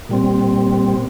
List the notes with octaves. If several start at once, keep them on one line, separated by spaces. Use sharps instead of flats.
A#2 G3 C4